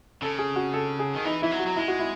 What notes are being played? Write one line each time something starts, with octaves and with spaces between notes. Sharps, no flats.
C#3 A4
G#4
F#4
A4
G#4
D#3
E3 D#4
E3 E4
F#3
F#4
F#3
G#3 E4
F#4
E4